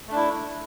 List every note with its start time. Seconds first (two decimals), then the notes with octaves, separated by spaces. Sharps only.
0.08 A3
0.12 D4
0.16 E4